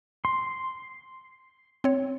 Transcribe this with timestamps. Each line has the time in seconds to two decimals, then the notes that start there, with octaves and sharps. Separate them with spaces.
0.25 C6
1.84 C4 C#5